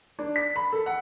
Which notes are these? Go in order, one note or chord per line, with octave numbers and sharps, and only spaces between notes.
D4
B6
B5
A4
F#5